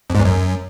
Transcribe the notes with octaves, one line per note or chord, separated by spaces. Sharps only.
F2
G#2
E2
F#2